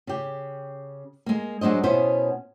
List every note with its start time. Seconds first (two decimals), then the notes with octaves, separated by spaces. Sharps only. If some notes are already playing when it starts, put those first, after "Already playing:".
0.07 C#3 G4
1.26 G#3 A#3
1.61 F#3 G#3 D4 C5 D#5
1.83 B2 B3 C#4 E4 C5